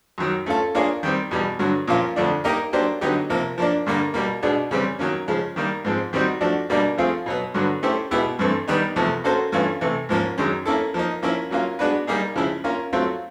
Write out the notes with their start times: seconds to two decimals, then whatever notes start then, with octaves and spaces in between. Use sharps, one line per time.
0.18 F#2 D#3 F#3
0.46 A3 C#4 F4 A4
0.75 A#3 D4 F4 G#4 C#5
1.03 D#3 G3 C4
1.31 E2 B2 G3
1.59 G2 D3 F#3
1.87 A#2 F3 A#3 C#4 F4
2.16 F2 D3 F3 A3 D4
2.44 A#3 D#4 G4 A#4 D#5
2.73 F#3 A#3 D4 G4 C5
3.01 D3 F#3 B3 D#4 G4
3.29 C3 F3 A#3
3.58 F3 A#3 D4
3.86 G2 D3 G3 A#3
4.14 B2 G3 A#3
4.42 B2 G#3 B3 D4
4.71 C#3 E3 G3 C4
4.99 D#3 F#3 A#3 C#4
5.28 C#3 F3 G#3
5.56 D#3 G3 A#3
5.85 G#2 F3 G#3 C4
6.13 D#3 G3 C4 D#4 F#4
6.41 F3 A3 D4 F#4
6.70 B2 G3 A#3 D4
6.97 F3 A3 C4 F4 G#4
7.26 B2 F#3 B3
7.54 G2 D3 F#3 B3
7.83 A3 C#4 E4 G4 C5
8.11 B2 G#3 B3 E4 G4
8.39 G2 E3 A3 C4
8.68 D#3 G3 B3 D#4
8.96 E2 C3 F3 A3
9.24 A#3 C#4 F#4 A4 C5
9.52 G2 E3 A3 C#4 F4
9.81 C3 E3 A3
10.09 G#2 F3 A#3 C#4
10.38 F#2 D#3 G#3 C#4
10.66 A#3 C#4 E4 A4
10.94 F3 A#3 D#4
11.23 F3 A#3 C#4 E4
11.51 F#3 A#3 C#4 F4
11.79 G#3 B3 D4 F#4 B4
12.07 G3 A#3 D#4 G#4
12.36 C#3 F3 G#3 C#4 E4
12.64 A#3 C#4 F4 A#4
12.93 F#3 A3 C4 F4